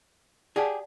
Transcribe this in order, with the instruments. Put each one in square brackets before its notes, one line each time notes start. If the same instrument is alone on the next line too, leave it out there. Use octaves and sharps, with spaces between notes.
[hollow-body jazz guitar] G4 G#4 [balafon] D5 F#5 A5